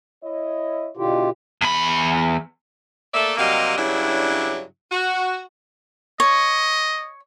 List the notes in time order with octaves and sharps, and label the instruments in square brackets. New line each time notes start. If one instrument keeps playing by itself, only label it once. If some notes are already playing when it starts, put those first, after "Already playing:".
[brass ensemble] E4 C#5 D#5
[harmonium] B2 F4 G4 [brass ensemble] D3 E4
[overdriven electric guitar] E2 B5
[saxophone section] A3 A#3 A4 D5 E5
C3 F#3 G3 A#3 D#5 F5
G2 C#3 F#3 D4 E4
F#4
[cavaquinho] C#5 [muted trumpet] D#5